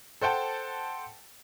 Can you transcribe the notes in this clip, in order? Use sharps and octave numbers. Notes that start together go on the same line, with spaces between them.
A4 C5 F#5 G5 A5